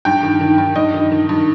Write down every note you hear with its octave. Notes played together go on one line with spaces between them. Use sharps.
G2 G5
D#3
D#3
G2
G2 D#5
D#3
D#3
G2